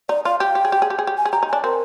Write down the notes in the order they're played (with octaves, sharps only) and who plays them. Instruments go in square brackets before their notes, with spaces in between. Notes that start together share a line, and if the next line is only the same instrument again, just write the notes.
[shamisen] D#4 [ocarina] D5
[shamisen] F4 [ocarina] F5
[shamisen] G4 [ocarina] G5
[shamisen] G4
G#4
G4
G#4
G4
G#4
G4
[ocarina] G#5
[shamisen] G#4
[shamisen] G4 [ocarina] A#5
[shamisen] D#4
[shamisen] D4 [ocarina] G#5
[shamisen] C4 [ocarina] A#4